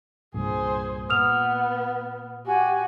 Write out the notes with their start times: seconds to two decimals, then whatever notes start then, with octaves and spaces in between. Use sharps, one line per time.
0.34 C2 G2 A#2 G#4 C5
1.10 A#2 B3 D#6 F6 F7
2.46 F#4 G4 G#5